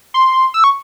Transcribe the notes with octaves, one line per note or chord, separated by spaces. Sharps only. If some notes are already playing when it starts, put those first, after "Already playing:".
C6
E6
C#6